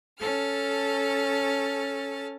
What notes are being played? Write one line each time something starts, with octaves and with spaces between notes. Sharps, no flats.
C#4 A4 A5 F6